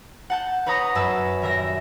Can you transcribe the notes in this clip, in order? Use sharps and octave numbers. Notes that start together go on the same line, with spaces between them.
F#5 A5 G6
B4 C#5 F#5 A#5 D#6
F#2 B4 A5 E6
D#1 A#4 E5 A#6